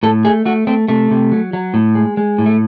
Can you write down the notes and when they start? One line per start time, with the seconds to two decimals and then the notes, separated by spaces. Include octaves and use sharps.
0.03 A2 A4
0.25 A3 G#4
0.45 A3 F#4
0.67 A3 C4
0.88 C3 A3
1.11 C3
1.32 F#3
1.53 F#3
1.74 A2
1.95 G#3
2.17 G#3
2.38 A2
2.46 A3